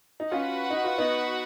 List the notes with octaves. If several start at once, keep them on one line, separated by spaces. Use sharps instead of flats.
D#4
C#4 F4 F#4 B4 F#5
D#4
F4
B3 D#4